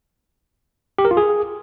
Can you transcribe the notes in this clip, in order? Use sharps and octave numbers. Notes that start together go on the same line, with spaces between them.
G4
A#4
F4
G#4